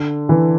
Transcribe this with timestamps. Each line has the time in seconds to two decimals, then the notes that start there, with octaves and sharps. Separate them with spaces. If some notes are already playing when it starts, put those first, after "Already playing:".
Already playing: D3
0.29 E3